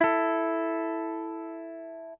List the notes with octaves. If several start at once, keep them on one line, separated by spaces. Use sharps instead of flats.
E4 A4